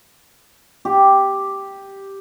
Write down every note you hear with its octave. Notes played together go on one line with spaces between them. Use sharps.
G4